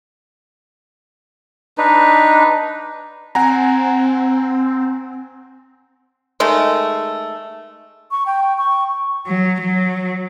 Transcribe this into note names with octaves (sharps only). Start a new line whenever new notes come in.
D4 D#4 B4
C4 F#5 G#5 A#5
D#3 G#3 A3
C#6
G5
C#6
F#3
F#3